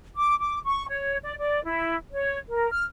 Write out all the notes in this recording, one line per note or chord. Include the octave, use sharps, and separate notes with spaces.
D6
D6
C#6
C#5
D5
D5
E4
C#5
A#4
F6